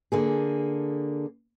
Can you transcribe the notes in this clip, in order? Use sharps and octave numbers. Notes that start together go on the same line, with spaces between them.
D3 A#3 G#4